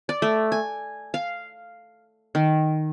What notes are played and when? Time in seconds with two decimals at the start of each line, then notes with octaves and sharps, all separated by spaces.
0.09 D5
0.22 A3
0.52 G#5
1.14 F5
2.35 D#3